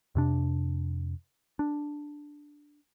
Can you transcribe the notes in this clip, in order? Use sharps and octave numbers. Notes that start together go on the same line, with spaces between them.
F2 C3 D4
D4